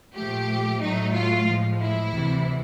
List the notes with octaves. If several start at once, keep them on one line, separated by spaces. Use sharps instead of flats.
A#2 F3 A3 G4
A2 F#3 A3 D#4
F4
A2 F3 G#3
E4
D2 C3 E3